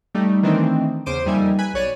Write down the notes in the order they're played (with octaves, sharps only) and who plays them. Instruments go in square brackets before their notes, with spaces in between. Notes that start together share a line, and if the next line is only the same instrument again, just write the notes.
[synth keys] G3 A3 D#4
D#3 E3 A3 C4 D4 D#4
E2 C#3 C5 D6 D7 D#7
F2 G3 A#3 D#4 E5 G#5
B4 G#5 B5 F#6
B1 C#5 D5 D#7